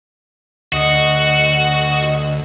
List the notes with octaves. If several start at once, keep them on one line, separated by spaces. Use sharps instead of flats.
D2 F#4 D#5